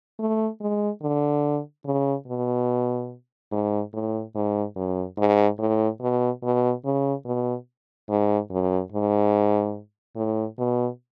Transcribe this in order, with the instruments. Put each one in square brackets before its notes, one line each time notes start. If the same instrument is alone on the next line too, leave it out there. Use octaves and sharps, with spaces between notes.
[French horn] A3
G#3
D3
C#3
B2
G#2
A2
G#2
F#2
G#2
A2
B2
B2
C#3
B2
G#2
F#2
G#2
A2
B2